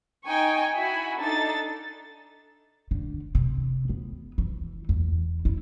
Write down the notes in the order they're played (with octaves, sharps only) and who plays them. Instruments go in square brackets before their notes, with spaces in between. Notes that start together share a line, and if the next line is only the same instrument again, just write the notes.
[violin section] D#4 G5 G#5 C#6
E4 F#4 G#5 B5
D4 D#4 A4 A6
[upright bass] D3
C3
B3
E3
E2
E4